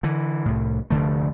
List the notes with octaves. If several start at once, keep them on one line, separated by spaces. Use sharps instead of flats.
D3 E3
C2 A2
F1 D2 D3 A3